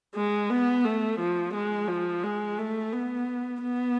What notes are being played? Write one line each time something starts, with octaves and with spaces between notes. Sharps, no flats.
G#3
B3
A3
F3
G#3
F3
G#3
A3
B3
B3